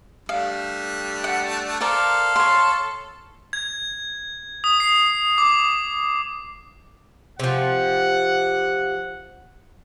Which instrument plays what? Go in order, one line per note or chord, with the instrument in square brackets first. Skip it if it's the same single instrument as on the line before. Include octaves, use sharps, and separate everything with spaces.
[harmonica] G3 A3 D4 [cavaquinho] F5
[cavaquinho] F#5
[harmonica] A4 F5 [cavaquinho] A#4 C5 D5
[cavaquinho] C#5 C6
[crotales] G#6
D#6
C7
D6
[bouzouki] C3 F3 [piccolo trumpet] F#5